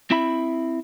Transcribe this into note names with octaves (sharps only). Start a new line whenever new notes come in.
C4 E4 E5 B5